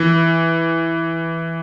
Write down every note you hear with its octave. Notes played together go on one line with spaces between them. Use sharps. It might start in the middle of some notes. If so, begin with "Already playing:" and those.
Already playing: E3